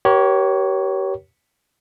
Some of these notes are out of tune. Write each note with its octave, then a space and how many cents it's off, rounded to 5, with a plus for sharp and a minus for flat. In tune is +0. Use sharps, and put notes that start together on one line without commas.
G4 -30 A#4 +40 C#5 +0